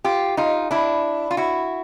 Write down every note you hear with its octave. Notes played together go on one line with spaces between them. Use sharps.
F4 G4
D#4 F4
D4 E4
F4
E4 F#4